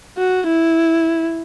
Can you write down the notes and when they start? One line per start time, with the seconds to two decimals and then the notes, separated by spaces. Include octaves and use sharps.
0.18 F#4
0.47 E4